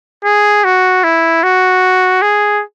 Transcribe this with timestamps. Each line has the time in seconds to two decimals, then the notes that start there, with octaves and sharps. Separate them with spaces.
0.25 G#4
0.64 F#4
1.04 E4
1.43 F#4
2.22 G#4